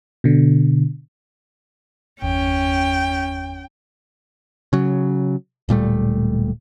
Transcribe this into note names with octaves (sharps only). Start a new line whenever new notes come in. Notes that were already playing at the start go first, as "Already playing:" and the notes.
B2 D3
G1 E2 C#4 G5
C#3 F#3
D1 A#2 G3 A3